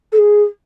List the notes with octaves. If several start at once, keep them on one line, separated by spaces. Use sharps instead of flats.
A4
G#4